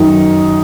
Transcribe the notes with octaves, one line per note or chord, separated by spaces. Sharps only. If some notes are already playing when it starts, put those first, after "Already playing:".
Already playing: F#2 D#3 D#4